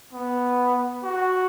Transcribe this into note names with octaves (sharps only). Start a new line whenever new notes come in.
B3
F#4